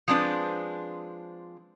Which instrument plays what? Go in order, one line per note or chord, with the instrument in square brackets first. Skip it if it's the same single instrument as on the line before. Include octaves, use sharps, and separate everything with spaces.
[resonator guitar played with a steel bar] F3 G#3 C4 D4 B4